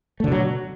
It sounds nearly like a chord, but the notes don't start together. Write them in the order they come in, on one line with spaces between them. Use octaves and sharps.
A3 D3 B2 F#3